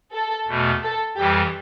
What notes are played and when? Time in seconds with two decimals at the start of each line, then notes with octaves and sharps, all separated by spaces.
0.12 A4
0.47 E2 B2 A3
0.82 A4
1.17 F2 E3 G3 G4